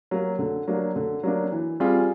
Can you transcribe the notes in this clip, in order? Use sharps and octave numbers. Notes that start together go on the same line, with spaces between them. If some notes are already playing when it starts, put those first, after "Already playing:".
F#3 A#3
D3
F#3 A#3 D4
D3
F#3 A#3 D4
E3
G3 C4 F4 G#4